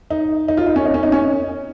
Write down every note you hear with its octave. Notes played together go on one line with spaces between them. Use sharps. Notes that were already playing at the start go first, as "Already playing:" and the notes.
D#4
D#4
F4
D#4
C#4
D#4
C#4
D#4
C#4